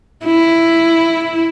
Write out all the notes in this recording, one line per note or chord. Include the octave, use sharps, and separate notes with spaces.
E4